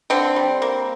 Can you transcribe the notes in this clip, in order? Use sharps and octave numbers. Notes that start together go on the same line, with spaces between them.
D3 C4
G3
A#3